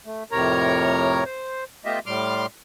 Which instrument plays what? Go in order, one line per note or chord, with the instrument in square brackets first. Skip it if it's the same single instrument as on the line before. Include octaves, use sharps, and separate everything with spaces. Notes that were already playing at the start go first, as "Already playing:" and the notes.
[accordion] A3
F2 A2 C3 A#4 C#5 A#5
C5
A3 B3 F4 G4 D#5 E5
A2 G3 C6 D6 F6